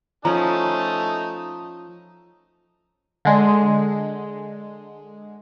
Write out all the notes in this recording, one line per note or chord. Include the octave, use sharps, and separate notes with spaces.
F3 A3 C#4 D#4 A5 A#5
D3 G#3